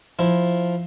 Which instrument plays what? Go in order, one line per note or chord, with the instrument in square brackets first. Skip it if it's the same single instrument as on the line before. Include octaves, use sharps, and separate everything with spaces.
[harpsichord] F3 E4